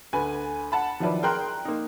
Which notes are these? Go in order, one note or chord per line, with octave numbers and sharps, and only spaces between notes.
D2 B4 G#5
F#5 A5 B5
D#3 F3 F#3 E4 B4 D5
G#4 A#4 G5 A#5 C6 F#6
A#3 D#4